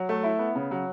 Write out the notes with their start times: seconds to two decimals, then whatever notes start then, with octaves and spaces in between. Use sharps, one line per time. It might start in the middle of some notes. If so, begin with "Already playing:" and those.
Already playing: F#3
0.09 A3
0.23 E4
0.39 B3
0.55 C#3
0.71 F#3